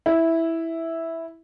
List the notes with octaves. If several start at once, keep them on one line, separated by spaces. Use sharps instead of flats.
E4